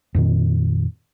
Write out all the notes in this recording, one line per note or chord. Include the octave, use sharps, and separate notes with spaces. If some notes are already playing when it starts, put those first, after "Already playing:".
F2 A#2 D#3